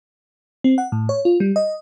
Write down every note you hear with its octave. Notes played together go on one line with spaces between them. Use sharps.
C4
F#5
A2
C#5
F4
G3
D#5